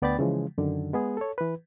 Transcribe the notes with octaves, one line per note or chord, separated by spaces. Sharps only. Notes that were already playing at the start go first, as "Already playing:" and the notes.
D2 B3 D5 G5 B5 A6
C#3 E3 F3 G#3
F#2 D3 D#3
G#3 B3 G#4
A4 C#5
E3 B4